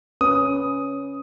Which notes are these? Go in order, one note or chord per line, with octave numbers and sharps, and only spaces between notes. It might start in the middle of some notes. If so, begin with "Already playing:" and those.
C#4 B4 D#6